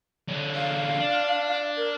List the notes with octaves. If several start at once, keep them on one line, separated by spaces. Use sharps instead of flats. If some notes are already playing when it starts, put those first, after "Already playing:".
D3 C#4
F5
D4
A#4